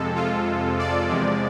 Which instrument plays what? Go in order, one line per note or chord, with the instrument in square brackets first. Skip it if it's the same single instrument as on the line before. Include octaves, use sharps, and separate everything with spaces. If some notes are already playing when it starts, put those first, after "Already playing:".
Already playing: [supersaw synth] F2 C3 G#3 A4
F4
D5
E2 C3 F3 G#3